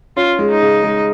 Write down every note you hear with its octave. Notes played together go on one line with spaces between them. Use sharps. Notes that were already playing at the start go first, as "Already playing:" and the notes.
C#4 F4
G#3
D#4
C#3
G#3